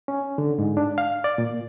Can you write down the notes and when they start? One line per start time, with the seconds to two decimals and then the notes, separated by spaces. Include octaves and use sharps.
0.08 C#4
0.38 D3
0.59 G#2
0.77 D4
0.98 F5
1.24 D5
1.38 A#2